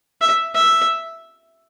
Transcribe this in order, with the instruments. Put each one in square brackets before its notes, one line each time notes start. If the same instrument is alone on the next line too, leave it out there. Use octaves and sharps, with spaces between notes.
[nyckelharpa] E5
E5